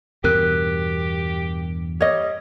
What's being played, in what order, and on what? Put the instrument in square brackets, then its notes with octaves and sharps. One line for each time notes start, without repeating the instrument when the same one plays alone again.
[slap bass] E2 G2 B2 [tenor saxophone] G4 [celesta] A#4 F#6
[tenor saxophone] G3 [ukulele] C#5 D#5